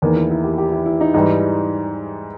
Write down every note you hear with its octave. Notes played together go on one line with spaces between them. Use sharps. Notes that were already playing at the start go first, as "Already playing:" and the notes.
E2 D#3 A#3 D#4
E4
E4
G4
G4
E4
E4
D#4
G#2 E3 G3 D#4